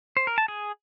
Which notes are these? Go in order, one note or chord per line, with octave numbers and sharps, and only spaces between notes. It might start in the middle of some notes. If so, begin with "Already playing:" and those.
C5
A#4
A5
G#4